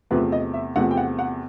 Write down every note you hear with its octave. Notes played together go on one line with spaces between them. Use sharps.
E2 C3 F3 A3 B4
D#5
E5
E2 C3 F3 A3 F#5
G5
F#5
F#5